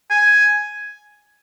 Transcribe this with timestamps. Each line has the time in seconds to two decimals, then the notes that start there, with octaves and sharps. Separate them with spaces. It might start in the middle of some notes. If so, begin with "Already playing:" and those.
0.10 G#5